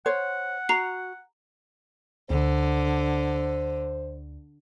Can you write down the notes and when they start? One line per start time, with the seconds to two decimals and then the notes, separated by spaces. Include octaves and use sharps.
0.06 C5 C#5 F#5
0.69 F#4 A#5 C7
2.30 D2 D3 C5